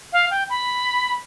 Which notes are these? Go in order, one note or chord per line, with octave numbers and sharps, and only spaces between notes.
F5
G5
B5